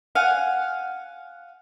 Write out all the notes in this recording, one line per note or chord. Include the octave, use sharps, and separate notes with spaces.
F5 F#5 G#5